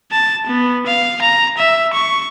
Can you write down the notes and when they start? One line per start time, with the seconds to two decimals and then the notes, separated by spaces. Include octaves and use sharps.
0.12 A5
0.47 B3
0.86 F5
1.22 A#5
1.57 E5
1.94 C#6